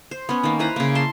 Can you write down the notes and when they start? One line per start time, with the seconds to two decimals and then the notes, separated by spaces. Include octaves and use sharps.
0.11 C5
0.29 B3 C#4
0.43 D#3 A#3
0.59 E4 B4 C5 A#5
0.76 C#3 A#3
0.95 A5 C6